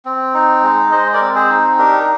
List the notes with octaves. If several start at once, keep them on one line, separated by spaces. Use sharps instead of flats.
C4
D#4
G#3
G#3 C5 D#5
A#4 D5
C4
G#4 C5
D#4
D4 G4 A#4